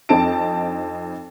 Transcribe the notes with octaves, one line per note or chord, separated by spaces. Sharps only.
F2 C4 D4 D#4 A5 D7